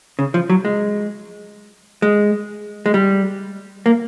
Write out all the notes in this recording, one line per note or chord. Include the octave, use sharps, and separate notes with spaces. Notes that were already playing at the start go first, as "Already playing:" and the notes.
C#3
F3
F#3
G#3
G#3
G#3
G3
A#3